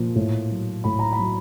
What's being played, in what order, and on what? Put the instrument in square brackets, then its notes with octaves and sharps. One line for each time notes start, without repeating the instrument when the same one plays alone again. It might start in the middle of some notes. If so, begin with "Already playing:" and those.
Already playing: [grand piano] A#2 F3
A2
F#3
A2 B5
A#5
B5
F#3